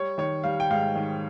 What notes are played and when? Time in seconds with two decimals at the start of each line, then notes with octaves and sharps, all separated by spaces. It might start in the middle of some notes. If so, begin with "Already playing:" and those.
Already playing: G3 C#5
0.18 D#3 C#5
0.44 G3 F5
0.60 G5
0.70 G#2 F5
0.95 D#3